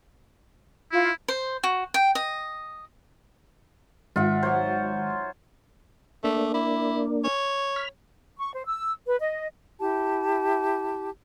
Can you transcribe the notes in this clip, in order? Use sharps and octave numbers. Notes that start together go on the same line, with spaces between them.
E4 F4
C5
F#4
G5
D#5
G#1 F4 E5 F#5
F#3 C5 C#5
A3 A#3 D4
E4
C#5
B5 F6
C#6
C5
E6
B4
D#5
E4 G4 A5